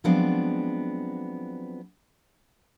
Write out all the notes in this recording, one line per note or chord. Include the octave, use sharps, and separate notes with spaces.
F3 F#3 G#3 B3 C4 D4